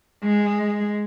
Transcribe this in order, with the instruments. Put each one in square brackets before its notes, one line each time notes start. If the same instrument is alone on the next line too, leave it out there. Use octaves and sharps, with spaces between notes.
[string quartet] G#3